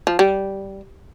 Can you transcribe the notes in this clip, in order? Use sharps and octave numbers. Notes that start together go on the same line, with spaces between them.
F3
G3